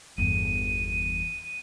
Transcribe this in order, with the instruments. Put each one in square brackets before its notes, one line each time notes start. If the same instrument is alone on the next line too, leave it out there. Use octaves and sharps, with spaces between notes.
[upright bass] G1 E2 [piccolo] D#7